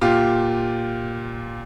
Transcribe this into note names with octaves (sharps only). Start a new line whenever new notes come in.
A#2 F4 G4